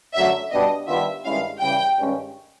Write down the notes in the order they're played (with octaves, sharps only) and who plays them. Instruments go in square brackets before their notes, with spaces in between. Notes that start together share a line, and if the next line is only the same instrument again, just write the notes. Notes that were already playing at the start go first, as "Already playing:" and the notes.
[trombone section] F#2 D3 F#3 A3 [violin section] E5
[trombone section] B2 G3 B3 D4 [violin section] D#5
[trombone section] D#3 G3 B3 D4 F4 [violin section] E5
[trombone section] G2 D#3 G#3 C#4 E4 [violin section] F5
[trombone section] C#3 E3 G3 [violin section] G5
[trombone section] G2 D#3 G#3 C#4